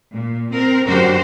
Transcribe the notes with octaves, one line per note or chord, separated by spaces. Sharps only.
A#2
C4 A#4
F#2 D3 F#4 G4 A#4 C5